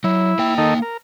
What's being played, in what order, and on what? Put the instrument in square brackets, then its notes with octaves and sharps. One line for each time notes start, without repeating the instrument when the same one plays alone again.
[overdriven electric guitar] F#3 [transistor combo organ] E4
[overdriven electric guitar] A#3 G5
[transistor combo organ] D#3 D#4 A4
A#4